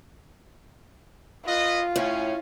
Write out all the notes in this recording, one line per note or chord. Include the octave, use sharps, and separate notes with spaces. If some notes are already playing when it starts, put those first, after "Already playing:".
F4 B4 D#5
A2 C#4